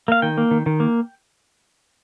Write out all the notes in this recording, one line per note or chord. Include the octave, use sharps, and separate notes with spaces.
A#3 F5
D#3 G5
A#3
D#3
D#3
A#3